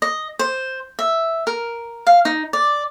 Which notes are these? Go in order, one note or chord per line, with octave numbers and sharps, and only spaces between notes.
D#5
C5
E5
A#4
F5
D#4
D5